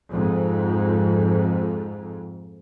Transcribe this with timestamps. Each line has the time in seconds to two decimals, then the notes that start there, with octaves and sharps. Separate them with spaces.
0.10 F2 G#2